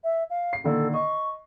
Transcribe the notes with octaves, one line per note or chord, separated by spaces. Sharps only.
E5
F5
C7
A#2 D3 D#3 A4
D#5 C#6